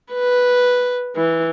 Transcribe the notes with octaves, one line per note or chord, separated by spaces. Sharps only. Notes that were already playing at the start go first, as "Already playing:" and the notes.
B4
E3